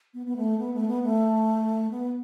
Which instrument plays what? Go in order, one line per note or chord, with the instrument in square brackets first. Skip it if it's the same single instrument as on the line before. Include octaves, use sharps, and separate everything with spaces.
[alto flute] B3
B3
A3
B3
A3
B3
A3
B3